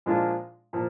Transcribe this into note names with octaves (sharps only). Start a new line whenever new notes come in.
A#2 F3 G#3 D4 F4
A#2 F3